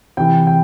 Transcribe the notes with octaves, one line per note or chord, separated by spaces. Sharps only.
C3 E3 G5
G5